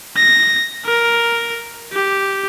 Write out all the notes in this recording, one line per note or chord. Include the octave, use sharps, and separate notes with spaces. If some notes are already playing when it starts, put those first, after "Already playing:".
A#6
A#4
G4